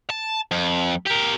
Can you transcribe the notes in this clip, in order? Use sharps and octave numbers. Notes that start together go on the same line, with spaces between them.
A5
F2
G4 A#4